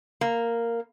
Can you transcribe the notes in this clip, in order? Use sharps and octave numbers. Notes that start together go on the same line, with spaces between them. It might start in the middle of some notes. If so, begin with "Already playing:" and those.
A#3